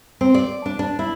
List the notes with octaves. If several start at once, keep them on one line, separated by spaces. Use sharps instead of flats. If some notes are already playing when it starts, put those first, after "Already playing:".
C4
D5
D4
D4
E4